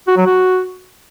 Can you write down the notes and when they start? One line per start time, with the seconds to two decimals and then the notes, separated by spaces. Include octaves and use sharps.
0.08 F#4
0.17 F#3
0.26 F#4